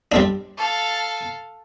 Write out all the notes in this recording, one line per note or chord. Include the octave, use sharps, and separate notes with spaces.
G3 C4 D4
A4 F5